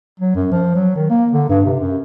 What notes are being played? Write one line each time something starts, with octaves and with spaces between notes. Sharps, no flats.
F#3
F#2
F3
F#3
D#3
A#3
D3
G2
C3
F#2